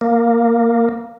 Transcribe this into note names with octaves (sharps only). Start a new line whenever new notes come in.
A#3